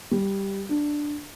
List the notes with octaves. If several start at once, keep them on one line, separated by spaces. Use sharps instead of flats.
G3
D4